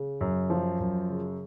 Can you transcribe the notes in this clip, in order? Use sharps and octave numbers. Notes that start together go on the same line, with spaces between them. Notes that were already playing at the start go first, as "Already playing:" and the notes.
Already playing: C#3
F#2
F3
F#2
C#3